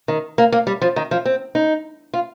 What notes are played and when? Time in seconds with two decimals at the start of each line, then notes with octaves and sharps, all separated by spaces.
0.08 D#3
0.38 A#3
0.52 A#3
0.67 G3
0.81 F3
0.96 D#3
1.11 F3
1.25 C4
1.55 D#4
2.14 F4